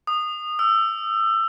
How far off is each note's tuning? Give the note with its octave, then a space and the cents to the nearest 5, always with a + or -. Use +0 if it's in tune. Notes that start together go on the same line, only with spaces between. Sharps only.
D#6 -20
E6 +20